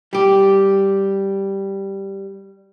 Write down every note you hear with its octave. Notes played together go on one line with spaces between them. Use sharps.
G3 G4